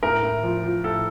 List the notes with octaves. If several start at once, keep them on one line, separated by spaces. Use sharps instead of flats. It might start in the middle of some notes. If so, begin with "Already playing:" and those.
A2 A#4
A2
F3
F3
A2 A4